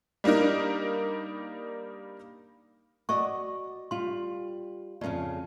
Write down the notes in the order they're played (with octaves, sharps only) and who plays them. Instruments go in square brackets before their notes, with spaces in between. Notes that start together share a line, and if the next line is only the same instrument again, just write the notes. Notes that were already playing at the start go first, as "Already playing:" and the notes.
[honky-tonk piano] G3 A#3 D4 D#4 A#4
[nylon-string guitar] F#4 D5 D#5 [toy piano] C#6
[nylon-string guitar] G3 F4 [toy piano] C6
[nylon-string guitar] F2 A2 C#3 [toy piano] D5